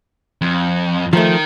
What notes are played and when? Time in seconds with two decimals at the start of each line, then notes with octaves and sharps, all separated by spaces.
0.41 F2
1.13 D#3 F3 A3